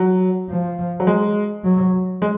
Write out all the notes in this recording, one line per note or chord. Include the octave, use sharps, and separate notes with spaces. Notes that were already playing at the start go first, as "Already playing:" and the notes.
Already playing: F#3
F3
F#3
G#3
F#3
G#3